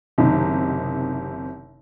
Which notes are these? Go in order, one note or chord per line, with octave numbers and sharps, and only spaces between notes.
F#1 C3 D#3 D#4